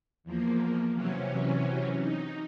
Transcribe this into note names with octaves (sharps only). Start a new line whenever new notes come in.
E2 F3 A#3
C3 E3 F#3 C#4
D#4